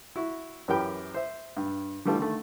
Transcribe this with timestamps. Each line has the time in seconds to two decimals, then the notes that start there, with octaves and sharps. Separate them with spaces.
0.16 E4 F#4
0.68 F#2 E3 G4 A#4 G5 B5
1.14 C5 E5
1.57 G2
2.05 D3 E3 G3 A3 F4 A4
2.19 D3 D#3 A3